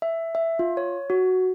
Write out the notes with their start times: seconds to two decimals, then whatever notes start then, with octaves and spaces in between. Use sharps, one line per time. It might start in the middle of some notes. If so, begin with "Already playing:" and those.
0.02 E5
0.35 E5
0.59 F4
0.77 C#5
1.10 F#4